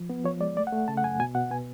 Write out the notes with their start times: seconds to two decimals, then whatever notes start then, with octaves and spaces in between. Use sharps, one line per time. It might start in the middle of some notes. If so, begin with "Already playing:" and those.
Already playing: F3
0.10 B3
0.24 F3 C#5
0.40 G#3 D5
0.56 A3 D5
0.67 F#5
0.72 A3
0.88 C#3 A5
0.97 F#5
1.04 F#2 G#5
1.19 B2 G#5
1.35 B2 F#5
1.51 B3 G#5